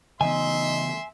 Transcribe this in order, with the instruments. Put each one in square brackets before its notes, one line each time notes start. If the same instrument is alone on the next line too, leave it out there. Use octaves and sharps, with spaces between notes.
[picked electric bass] C#3 E3 B3 [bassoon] D#4 [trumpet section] E5 C6 [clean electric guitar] G#5